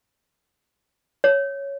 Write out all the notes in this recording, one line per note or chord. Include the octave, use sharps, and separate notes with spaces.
C#5